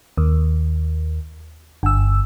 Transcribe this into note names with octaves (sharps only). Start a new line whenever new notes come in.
D#2
G1 E6